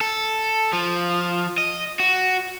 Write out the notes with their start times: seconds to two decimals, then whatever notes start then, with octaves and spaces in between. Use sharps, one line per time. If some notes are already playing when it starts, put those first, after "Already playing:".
0.01 A4
0.73 F3
1.58 D#5
2.00 F#4